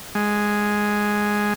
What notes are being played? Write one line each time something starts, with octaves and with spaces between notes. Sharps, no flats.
G#3